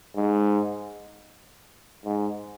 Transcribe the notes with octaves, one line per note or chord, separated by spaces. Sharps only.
G#2
G#2